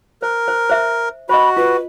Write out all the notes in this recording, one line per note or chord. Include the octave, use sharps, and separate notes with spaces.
A#4 C5
C5
C5 E5
F#4 C5 D#5 B5
F4 B4